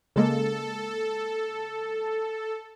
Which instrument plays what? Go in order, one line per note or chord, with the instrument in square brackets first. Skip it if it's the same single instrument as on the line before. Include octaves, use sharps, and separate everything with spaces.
[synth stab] C#3 G#3 A#3 [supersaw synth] A4